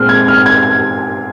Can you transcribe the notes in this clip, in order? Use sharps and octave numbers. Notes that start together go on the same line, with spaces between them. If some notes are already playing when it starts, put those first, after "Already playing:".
Already playing: A#2 G#3 C4 F6
G#6
F6
G#6